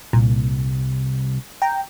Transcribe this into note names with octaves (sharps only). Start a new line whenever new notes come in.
C2 A#2
G5 A#5